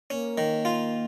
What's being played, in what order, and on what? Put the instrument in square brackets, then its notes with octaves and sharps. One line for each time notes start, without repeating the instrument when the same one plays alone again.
[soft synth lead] A#3 [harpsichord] C#4
[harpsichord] D#3
F4